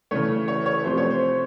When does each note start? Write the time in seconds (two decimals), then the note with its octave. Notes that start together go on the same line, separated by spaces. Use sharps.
0.11 C#3 E3 A3 C#5
0.48 C#5
0.66 C#5
0.84 C3 F3 A3 C5
0.97 C#5
1.10 C5